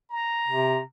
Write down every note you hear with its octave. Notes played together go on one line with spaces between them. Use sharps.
A#5
C3